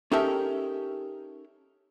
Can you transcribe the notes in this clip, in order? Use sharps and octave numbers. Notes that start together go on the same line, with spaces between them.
C#4 D#4 G4 A4 A#4 E5